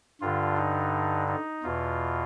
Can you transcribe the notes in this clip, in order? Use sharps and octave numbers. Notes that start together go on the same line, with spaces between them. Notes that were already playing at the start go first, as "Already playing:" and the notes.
G2 D3 F4
D#4
D#4
E2 B2 F4